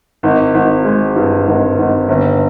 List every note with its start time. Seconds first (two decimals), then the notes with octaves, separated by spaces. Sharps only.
0.23 G#1
0.54 G#1
0.85 G#3
1.16 G2
1.47 G#1
1.78 G#1
2.09 G1